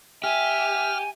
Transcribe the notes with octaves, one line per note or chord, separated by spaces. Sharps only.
G4 E5 G#5 F6